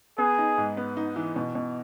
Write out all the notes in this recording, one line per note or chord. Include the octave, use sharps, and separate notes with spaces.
B3 G#4
D#4
G#2
B3
D#4
E3
B2
B2